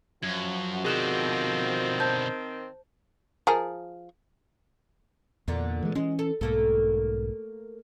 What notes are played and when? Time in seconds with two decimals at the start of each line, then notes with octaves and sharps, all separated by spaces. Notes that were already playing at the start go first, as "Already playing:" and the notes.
0.23 F#2 F3 F#4 G#6
0.84 B2 D3 D#3 C4 G#4 F#6 E7
2.00 C5 A5 G6
3.47 F3 G#4 A#4
5.48 E2 A#2 D3 A#3
5.83 E3 G#3
5.95 E3 G#3 C#4
6.19 A4
6.41 B1 G#2 A3 A#3 A4